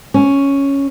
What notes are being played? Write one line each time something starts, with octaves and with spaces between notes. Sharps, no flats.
C#4